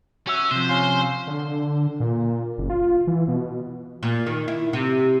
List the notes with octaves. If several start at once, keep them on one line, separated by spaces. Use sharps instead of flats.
C#4 F#4 E5
C3 F3 C5
C#4 F5 C6
D3
A#2
F#1
F4
E3
B2
A#2
D#3
E4
C3